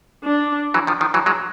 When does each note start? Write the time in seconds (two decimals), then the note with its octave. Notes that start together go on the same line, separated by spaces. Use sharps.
0.24 D4
0.74 E3 F#3
0.87 D#3 F3
1.01 D#3 F3
1.14 E3 F#3
1.26 F#3 G#3